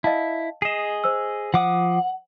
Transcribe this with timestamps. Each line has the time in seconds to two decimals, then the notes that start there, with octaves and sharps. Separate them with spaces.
0.04 E4 D#5 F5 A5
0.62 G#4 D#5 C7 E7
1.04 C5 E6
1.54 F3 F#5 D6 D#6